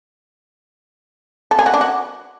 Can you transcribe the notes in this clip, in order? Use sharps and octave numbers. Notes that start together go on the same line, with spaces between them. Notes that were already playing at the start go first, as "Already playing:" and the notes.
A4
G#4
F#4
D4
F#4